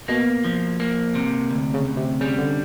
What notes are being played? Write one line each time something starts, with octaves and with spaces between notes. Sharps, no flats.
B2 A#3
F3
A#3
C3
D2
C#3
D2
C3
C#3 G3
D3